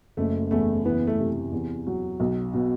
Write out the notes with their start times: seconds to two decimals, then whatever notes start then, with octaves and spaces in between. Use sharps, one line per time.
0.17 F#1 A3
0.51 E2 A3
0.85 E3 B3
1.07 A3
1.19 C3
1.52 E2
1.87 F#3
2.20 B1
2.54 B2